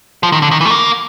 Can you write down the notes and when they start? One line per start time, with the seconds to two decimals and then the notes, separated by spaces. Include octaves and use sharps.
0.23 F3
0.32 D#3
0.42 D3
0.51 D#3
0.61 E3
0.65 A3
0.70 A#3